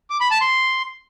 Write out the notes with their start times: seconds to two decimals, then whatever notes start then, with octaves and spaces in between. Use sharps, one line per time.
0.10 D6
0.20 B5
0.31 A5
0.41 C6